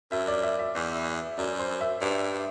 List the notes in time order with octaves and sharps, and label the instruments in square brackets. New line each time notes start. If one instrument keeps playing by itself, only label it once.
[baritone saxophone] F#2 [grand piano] E5
[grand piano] D5
E5
E5
[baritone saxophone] E2 [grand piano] D5
[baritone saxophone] F#2 [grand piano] D5
[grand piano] C5
E5
[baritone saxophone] G2 [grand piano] D5